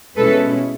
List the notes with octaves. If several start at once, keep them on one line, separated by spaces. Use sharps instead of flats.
B2 G#3 C#4 E4 A4 B4